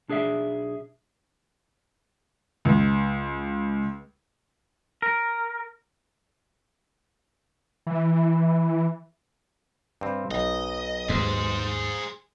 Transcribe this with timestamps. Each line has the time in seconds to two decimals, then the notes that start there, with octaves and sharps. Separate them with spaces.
0.08 B1 D4 G#4 D5 E5
2.65 C#2
5.02 A#4
7.87 E3
10.01 G2 C4
10.31 B1 D#5
11.09 D#2 G#2 G#4 C5